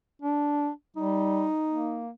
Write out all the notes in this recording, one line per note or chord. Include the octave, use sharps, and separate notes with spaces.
D4
G3 D#4
A#3